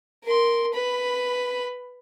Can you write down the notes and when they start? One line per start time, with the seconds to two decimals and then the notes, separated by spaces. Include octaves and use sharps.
0.23 A#4 C6
0.73 B4 B5